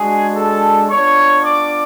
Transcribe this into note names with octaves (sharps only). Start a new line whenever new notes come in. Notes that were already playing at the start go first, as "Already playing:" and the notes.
Already playing: G#3 D4 F#4 G#4 G#5
A4 A5
B3 D4 F4 C#5 C#6
D5 D6